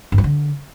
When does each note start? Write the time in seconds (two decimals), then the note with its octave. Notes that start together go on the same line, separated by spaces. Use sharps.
0.12 G2
0.18 F3
0.24 D3